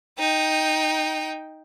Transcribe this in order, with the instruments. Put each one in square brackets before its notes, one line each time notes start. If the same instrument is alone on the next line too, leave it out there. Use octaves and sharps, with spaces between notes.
[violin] D#4 G5